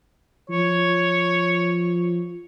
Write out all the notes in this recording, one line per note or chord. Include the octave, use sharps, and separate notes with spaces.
F3 C#5